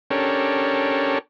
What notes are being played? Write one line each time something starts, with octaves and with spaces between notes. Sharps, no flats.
C#4 D4 G4 A4 A#4 C#5